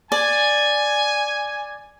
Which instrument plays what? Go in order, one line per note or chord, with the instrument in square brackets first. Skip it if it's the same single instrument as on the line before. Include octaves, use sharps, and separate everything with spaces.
[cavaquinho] D5 [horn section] G#5